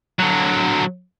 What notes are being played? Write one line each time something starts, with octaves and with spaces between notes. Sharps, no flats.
D3 F#3